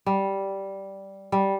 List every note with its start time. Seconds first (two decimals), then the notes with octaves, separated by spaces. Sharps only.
0.06 G3
1.32 G3